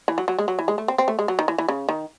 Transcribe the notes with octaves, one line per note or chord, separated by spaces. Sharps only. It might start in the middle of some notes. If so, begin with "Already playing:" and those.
E3
F#3
F#3
G#3
F#3
E3
G#3
A3
C4
C4
A3
G#3
F#3
D#3
E3
E3
C#3
D#3